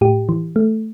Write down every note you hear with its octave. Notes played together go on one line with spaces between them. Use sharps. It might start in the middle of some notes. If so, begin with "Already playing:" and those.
A2 G4
E3
A3